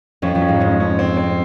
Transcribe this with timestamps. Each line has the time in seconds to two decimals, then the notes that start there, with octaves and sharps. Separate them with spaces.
0.22 F2 F3 C#4
0.35 F2 F3
0.42 C#4
0.48 G#2 G#3
0.60 G#2 G#3 C#4
0.80 C#4
0.99 C4
1.17 C4